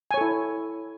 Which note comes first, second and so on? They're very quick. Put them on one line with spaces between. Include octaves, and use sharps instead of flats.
G#5 C#5 A4 E4